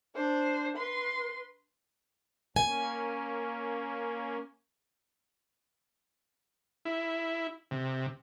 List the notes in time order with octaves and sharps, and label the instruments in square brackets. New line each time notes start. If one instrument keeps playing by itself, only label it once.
[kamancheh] D4 C5
B4 C6
[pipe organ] A#3 C#4 [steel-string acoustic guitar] G#5
[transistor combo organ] E4
C3